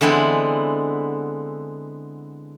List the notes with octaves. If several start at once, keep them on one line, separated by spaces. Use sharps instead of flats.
D3 E3 G#3 B3 C4